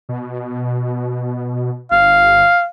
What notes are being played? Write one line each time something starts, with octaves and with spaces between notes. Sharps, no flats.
B2
G1 F5